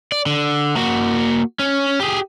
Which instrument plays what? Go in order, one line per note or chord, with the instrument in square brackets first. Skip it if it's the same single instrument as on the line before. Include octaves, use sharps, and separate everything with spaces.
[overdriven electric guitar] D5
D3
A#3 F#4
C#4
G4 G#4